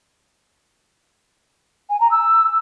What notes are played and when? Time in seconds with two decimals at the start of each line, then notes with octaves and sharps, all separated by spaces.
1.90 G#5
2.00 A#5
2.11 E6